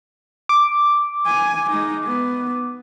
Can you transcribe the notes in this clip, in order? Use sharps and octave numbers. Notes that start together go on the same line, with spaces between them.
D6
G#5
G#3 D#4
B3